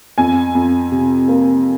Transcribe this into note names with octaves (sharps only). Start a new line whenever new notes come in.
F2 G#5
F2
C3
A#3